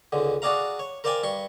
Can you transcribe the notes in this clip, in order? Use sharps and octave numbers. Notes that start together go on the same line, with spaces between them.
C#2 G#2 D3
D4 F#4 G#4 D5 F5 A#5
C#5
A#4 C5 D5 F5 G5 G#5
G2 C6 C#6